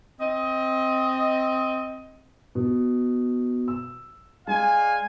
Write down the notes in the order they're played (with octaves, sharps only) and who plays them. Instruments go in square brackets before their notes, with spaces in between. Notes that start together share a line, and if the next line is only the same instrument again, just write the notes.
[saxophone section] C4 D#5
[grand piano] B2
E6
[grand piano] G#3 [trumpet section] D5 F5 G#5